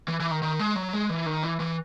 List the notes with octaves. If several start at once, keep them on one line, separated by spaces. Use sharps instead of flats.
E3
E3
D#3
D#3
G#3
F#3
G#3
E3
D#3
E3
E3